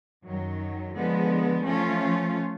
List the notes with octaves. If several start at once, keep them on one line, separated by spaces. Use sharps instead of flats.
F#2 D#3 F#3
D3 F3 G#3 B3
F3 A3 C#4 F4